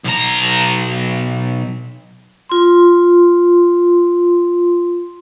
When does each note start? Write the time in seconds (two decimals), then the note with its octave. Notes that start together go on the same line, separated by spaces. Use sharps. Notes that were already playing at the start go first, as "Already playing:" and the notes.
0.04 B1 A#5
2.49 F4 C6